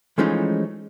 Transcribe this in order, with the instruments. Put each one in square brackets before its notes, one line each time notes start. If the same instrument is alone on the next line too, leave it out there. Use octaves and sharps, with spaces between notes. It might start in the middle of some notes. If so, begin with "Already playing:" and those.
[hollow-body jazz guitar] E3 F3 G#3 A3 C#4 D#4